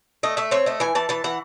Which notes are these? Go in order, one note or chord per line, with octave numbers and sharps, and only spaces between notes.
A3 D#5
A3 E5
C4 C#5
A3 D#5
E3 G#5
E3 A5
E3 A5
E3 F#5